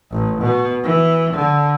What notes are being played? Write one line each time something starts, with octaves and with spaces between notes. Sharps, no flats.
A1
B2
E3
D3